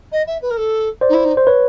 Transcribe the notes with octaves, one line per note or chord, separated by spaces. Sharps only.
D#5
E5
B4
A#4
A4
C5 D5
D#4
E4
D#4
C5
B4 C#5